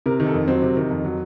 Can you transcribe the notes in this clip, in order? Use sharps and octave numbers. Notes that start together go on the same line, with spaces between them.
C3 A#4
D#3
A4
F2
F#3 C4
C3
D#3
F2
F#3